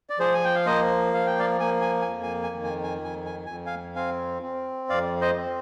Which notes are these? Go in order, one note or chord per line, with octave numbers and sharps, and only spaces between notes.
D5
F3 G#4 C5
G#5
G5
F5
A#3 C5 D#5
F3 F5
G5
D5 F5
A#3 G#5
G#5
G#5
F2
G#5
G#5
D#3
G#5
G#5
F2 G#5
G#5
F2 G#5
F5 G#5
C4 F5 G#5
C4
F2 D5 F5
C5 D#5
C4